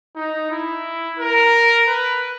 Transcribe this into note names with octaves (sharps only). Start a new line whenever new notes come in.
D#4
E4
A#4
B4